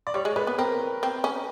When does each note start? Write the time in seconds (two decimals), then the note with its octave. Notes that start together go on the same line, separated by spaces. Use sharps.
0.07 D5
0.14 G3 C#5
0.25 G#3
0.36 G#3 B4
0.47 B3
0.58 C4 A#4
1.03 C4
1.24 C#4